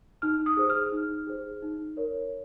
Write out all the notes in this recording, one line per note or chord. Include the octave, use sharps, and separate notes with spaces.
D#4 F6
D#6
G#4 C5
F6
D#4
G#4 C5
D#4
A#4 C#5